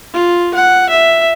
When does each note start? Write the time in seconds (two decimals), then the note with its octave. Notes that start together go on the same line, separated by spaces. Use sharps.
0.14 F4
0.54 F#5
0.90 E5